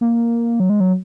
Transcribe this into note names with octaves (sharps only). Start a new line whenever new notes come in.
A#3
F#3
G#3
F#3